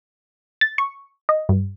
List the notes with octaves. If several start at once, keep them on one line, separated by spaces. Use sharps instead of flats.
A6
C#6
D#5
G2